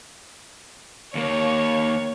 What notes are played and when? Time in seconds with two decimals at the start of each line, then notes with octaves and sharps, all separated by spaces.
1.15 D#2 A#3 C#5